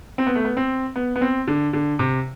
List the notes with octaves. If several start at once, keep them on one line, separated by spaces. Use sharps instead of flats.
C4
B3
A3
B3
C4
B3
B3
C4
D3
D3
C3